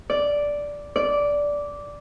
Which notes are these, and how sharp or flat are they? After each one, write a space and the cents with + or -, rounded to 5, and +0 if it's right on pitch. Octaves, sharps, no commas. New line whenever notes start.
D5 -5
D5 -10